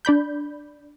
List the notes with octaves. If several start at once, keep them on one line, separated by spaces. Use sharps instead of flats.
D4 D5 B5 G6